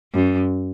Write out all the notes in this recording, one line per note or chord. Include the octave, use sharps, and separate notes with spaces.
F#2